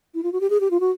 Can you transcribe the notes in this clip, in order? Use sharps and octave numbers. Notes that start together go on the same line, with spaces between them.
E4
F4
F#4
G4
G#4
G4
F4
F#4